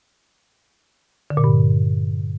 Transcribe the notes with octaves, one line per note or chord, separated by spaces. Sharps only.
D3
A#2
G2